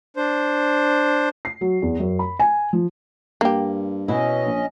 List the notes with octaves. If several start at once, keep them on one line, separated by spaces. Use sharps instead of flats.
D4 C5
C7
F#3
E2
F#2
B5
G#5
F3
G2 A#3 G4
B2 C#4 E4 D#5
A#1